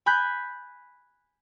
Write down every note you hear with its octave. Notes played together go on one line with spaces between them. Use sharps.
G#5 B5 F#6 G6